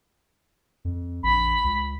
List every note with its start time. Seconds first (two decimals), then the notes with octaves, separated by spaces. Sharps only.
0.85 F2
1.23 A#1 B5
1.64 C#2